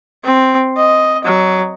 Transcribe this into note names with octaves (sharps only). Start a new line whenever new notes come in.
C4
D#5
F#3